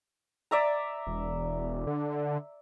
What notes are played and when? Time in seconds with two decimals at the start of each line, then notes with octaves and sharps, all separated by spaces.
0.51 D5 E5 A#5
1.07 E1
1.87 D3